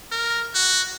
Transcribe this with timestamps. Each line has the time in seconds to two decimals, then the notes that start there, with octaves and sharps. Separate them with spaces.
0.12 A#4
0.55 F#4